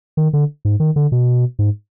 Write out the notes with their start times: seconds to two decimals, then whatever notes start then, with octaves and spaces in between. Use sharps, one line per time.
0.17 D#3
0.33 D3
0.65 G#2
0.80 D#3
0.96 D3
1.12 B2
1.59 G#2